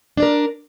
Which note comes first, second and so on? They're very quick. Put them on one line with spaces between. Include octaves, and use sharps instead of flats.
D4 D5 A#4